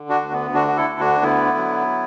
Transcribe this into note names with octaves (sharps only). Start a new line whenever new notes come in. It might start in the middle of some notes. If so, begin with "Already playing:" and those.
Already playing: D3
D4 F#4
D2
B3
D3 D4 F#4
F#4
E4 A4
D2
D4 F#4
D3 B3 E4
F#3